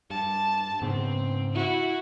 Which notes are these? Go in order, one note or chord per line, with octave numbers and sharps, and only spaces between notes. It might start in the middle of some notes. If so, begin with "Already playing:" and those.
G2 A5
G#2 C#3 B3 C4
E4 F#4